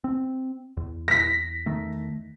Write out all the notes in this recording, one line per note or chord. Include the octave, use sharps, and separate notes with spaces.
C4
E2
A#6 B6
E2 D#3 A3